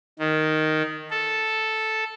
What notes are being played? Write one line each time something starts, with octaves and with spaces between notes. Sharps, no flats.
D#3
A4